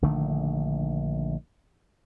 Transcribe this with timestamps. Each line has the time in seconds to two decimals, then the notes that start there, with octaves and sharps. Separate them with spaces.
0.02 A#1 D3 D#3 A3